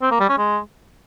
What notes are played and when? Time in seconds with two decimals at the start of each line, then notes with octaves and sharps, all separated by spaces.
0.02 C4
0.11 A#3
0.20 G3
0.29 C#4
0.38 G#3